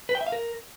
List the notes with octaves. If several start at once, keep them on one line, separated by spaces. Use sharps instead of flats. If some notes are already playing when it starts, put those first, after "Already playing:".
B4
G5
E5
F5
A#4